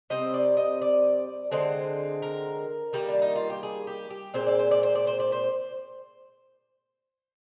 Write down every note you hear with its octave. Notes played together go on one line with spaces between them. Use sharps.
C3 G3 C4 D#5
D5
D#5
D5
D3 G#3 C4
A#4
D#3 G3 A#3
D4
D#4
F4
G4
G#4
G4
G4
A#2 G#3 C4 C5
D5
C5
D5
C5
D5
C5
D5
C5